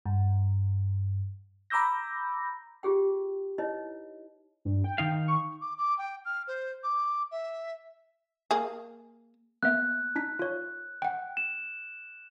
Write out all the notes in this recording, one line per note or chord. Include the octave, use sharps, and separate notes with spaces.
G2
A#5 B5 D6 E6 G6 A#6
F4 G4 G#4 G5
D#4 E4 B4 C#5 D#5
G2
G5
D#3 D#4 F5
C#6
D6
D6
G5
F6
C5
D6
E5
A#3 G#4
A#3 B3 E5 F#6
D4 D#4 B6
F4 C#5
F#5 G5
E7